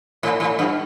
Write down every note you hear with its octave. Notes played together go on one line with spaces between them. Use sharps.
A2
A2
G2